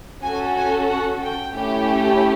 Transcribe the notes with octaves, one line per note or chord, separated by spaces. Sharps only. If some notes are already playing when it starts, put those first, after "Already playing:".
C#4 F#4 A4 G#5
G#5
F#5
G5
A3 C#4 E4 G4